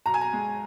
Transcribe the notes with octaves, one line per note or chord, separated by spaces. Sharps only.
B1 A#5
G#5
A#5
G#3